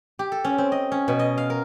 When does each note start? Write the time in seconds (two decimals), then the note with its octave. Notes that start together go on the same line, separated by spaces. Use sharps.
0.19 G4
0.32 A4
0.44 C#4
0.58 C4
0.72 D#5
0.92 C#4
1.08 B2
1.19 D#5
1.38 F5
1.50 A#4